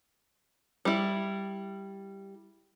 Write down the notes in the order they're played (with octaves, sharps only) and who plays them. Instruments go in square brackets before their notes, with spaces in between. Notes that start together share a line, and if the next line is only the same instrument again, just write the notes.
[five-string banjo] G3 E4